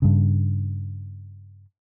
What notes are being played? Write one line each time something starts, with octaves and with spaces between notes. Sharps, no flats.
G2 C#3